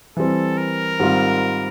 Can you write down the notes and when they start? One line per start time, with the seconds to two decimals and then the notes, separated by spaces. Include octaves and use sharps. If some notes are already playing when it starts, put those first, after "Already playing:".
0.17 E3 G3 C4 A4
0.58 A#4
1.00 G#2 D#3 G3 C4 F4